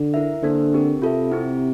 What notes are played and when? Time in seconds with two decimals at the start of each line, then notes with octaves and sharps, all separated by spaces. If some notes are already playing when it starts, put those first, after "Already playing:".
Already playing: D3
0.14 E4 A#4 E5
0.42 D3 A#3 D4 A4 C5
0.73 C4 G4 A#4
1.01 C3 F4 A4 E5
1.31 C4 E4 G4